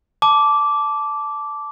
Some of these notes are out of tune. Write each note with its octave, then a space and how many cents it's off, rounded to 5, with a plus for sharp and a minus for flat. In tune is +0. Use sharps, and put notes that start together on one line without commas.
A5 -10 D6 -10